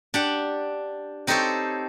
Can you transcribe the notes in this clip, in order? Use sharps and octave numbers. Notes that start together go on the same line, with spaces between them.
D4 G4 F#5
C4 D#4 G4 A4 C5 C#5